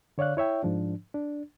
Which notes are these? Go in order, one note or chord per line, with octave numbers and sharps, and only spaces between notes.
D3 C#5 D5 F5 F#6
E4 C#5 E5 G5
G#2 F3 D4
D4